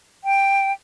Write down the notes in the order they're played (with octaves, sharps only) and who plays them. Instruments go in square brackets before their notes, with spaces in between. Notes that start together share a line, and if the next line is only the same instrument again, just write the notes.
[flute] G5